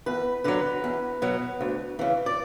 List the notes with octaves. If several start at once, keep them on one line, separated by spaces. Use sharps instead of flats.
E2 B4
D3 F#3 B4
E2
B2 F#3
D2
C#3 E3
D5